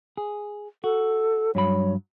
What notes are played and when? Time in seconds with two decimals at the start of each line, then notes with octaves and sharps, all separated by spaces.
0.17 G#4
0.84 F#4 A4
1.55 G2 F#3 C#5 B5